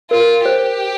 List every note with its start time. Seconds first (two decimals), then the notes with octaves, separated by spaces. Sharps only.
0.11 F4 A#4
0.46 G4 C5